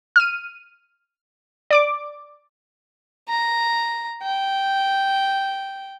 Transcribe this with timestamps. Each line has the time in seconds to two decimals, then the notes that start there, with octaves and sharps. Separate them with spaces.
0.16 F6 D#7
1.70 D5 D6 D7
3.29 A#5
4.23 G5